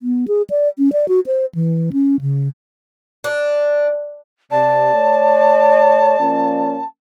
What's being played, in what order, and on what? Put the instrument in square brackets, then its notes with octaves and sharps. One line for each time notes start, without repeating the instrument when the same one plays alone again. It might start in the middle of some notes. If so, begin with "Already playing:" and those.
[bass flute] B3
G#4
D5
C#4
D5
F#4
C5
E3
C#4
C#3
[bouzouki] D4
[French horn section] C3 [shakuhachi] D5 [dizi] A5
[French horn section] A3 C#5
F3 A#3 C#4